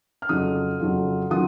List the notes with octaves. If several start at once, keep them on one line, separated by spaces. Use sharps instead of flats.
F6
F2 C#3 F#3 C#4 F4 D#6
F2 C#3 F#3 C#4 F4
D#3 F#3 C#4 F4 D#6